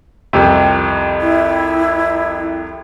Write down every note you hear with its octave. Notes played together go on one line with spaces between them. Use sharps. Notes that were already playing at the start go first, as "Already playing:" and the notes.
C2 F2 C3
E4